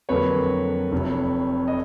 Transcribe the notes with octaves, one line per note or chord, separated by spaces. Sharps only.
F2 D3 F#3 A#3 B4 C#5
F1 F2 C3
D#5